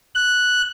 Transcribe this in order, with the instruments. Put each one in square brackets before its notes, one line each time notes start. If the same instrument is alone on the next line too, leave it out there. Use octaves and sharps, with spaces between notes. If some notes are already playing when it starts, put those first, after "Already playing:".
[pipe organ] F#6